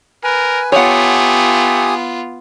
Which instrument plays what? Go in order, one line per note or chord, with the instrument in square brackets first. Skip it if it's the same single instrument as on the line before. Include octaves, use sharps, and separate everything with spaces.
[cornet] A#4 [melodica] B4 G#5
[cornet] A3 [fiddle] B3 F4 [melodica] G4 G#5 D#6 [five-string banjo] C#5 F#5